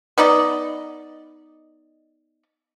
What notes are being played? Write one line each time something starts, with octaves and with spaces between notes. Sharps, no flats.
B3 D#4 D5 D#5